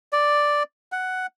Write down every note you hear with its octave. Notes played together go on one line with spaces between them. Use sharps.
D5
F#5